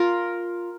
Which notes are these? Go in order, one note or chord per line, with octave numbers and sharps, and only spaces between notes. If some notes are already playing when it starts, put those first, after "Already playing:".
Already playing: F4 A#4